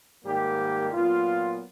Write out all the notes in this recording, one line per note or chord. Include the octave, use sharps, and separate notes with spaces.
G#2 D#3 G3 A#3 G4
A#2 F#3 B3 F4